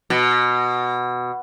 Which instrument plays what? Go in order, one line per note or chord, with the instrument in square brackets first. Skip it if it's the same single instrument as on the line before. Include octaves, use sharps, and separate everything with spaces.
[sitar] B2